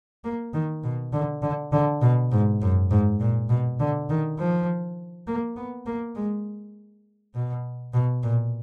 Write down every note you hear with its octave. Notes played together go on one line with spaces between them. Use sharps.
A#3
D#3
B2
D3
D3
D3
B2
G#2
F#2
G#2
A#2
B2
D3
D#3
F3
A#3
B3
A#3
G#3
B2
B2
A#2